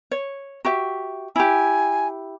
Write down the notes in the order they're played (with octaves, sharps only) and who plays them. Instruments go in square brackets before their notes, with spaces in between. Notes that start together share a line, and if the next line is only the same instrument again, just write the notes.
[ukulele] C#5
F#4 G4 E5
[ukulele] E4 G4 [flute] G#5